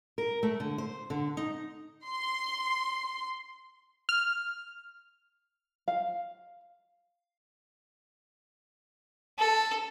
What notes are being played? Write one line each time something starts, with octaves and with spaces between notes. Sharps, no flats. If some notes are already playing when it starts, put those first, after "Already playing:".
A#4
A3
D3
C5
D3
D#4
C6
F6
F5
A4